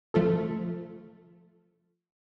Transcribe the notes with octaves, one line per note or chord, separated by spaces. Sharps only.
F3 A3 F4 A4